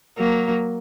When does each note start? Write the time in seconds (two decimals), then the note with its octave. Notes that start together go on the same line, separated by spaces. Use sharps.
0.18 F#3 A#3